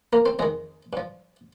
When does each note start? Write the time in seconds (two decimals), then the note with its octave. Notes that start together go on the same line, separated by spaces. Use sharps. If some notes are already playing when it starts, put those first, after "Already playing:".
0.13 A#3 A#4
0.26 C4 C5
0.39 F2 D#3 G#3 G#4
0.93 G2 F3